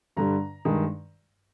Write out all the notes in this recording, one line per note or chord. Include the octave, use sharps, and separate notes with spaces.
G2 D3 G3 A#5
G2 D#3 G#3